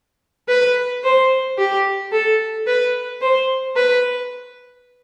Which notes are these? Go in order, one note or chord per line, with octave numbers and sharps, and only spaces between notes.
B4
C5
G4
A4
B4
C5
B4